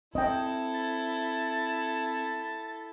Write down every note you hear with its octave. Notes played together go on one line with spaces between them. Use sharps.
C4 E4 A4 D#5 G5
A6